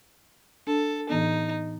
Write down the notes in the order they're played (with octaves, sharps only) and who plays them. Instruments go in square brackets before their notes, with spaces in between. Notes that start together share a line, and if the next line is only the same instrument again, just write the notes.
[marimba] D4 [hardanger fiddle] A4
[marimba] A2 E3 B3 [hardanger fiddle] D#4